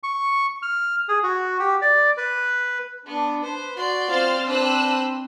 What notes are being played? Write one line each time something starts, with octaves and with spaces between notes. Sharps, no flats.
C#6
F6
G#4
F#4
G4
D5
B4
B3 D4
B4 C5
F#4 D5 C6
C4 F4 C5 F6 A6
D4 B4 C5 E6 F#6